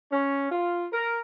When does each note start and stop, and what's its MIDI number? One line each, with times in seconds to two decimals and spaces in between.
0.12 0.50 61
0.51 0.85 65
0.92 1.18 70